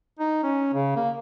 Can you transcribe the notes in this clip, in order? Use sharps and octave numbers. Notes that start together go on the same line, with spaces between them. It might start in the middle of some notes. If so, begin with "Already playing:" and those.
D#4
C#4
C#3
A#3